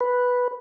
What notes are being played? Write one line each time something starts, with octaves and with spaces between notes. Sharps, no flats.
B4